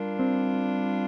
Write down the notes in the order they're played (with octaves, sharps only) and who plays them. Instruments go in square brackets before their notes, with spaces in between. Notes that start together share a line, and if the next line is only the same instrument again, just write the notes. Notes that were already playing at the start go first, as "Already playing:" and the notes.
Already playing: [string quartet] G3 D4 F4 [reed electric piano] A#4
[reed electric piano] C4